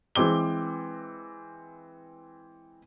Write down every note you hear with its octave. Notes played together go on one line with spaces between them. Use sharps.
E3 G#3 C4 D6 G7